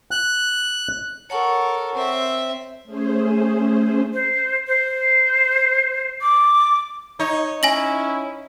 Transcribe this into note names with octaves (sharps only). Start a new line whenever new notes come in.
F#6
A4 A#4 C#5 F#5 C#6
C4 E5
A3 C#4 G#4 C5
C5
C5
D6
D#4 C#5
C#4 E4 G#5 A#6 F#7